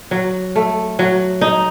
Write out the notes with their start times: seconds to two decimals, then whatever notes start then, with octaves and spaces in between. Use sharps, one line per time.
0.11 F#3
0.56 A3
0.99 F#3
1.41 D#4